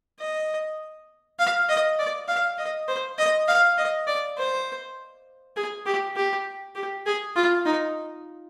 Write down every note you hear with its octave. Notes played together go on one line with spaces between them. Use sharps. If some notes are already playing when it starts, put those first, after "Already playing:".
D#5
F5
D#5
D5
F5
D#5
C5
D#5
F5
D#5
D5
C5
G#4
G4
G4
G4
G#4
F4
D#4